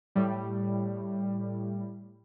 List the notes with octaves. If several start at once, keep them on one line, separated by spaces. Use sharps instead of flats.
A2 G3